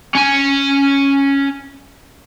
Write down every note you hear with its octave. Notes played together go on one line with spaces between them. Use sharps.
C#4 G#5